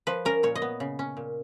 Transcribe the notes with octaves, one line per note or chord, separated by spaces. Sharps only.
F3 B4
C#4 A#4
A#2 C#5
D#5
B3
C#3
C#4
A#2